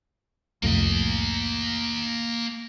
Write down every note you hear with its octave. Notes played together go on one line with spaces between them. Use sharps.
C2 F2 A2 A#3 D#5